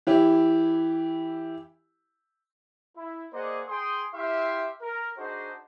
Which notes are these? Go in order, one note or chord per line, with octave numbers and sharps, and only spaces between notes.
E3 E4 G4
E4
A#3 G#4 C5 D5 D#5 F#5
G#4 G5 C6 D#6
E4 G4 E5 F5 G5 C6
A#4
D4 D#4 F#4 G#4 C5